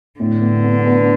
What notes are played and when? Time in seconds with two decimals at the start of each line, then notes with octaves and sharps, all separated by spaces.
0.20 A2 D3
0.41 B3
0.64 B3
0.86 B3